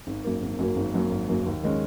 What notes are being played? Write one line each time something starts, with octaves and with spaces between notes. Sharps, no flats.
G#1
F#2 F#3 A#3
G#1
F#2 F#3 A#3
G#1
F#2 F#3 A#3
G#1
F#2 F#3 A#3
D#2
D#3 G#3 C#4